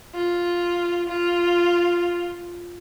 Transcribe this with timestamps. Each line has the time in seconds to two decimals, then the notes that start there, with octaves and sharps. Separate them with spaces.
0.15 F4
1.09 F4